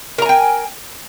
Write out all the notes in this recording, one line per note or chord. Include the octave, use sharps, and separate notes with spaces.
A#4 G5 G#5 A#5